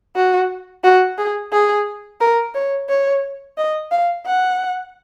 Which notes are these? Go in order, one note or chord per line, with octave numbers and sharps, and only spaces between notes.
F#4
F#4
G#4
G#4
A#4
C#5
C#5
D#5
F5
F#5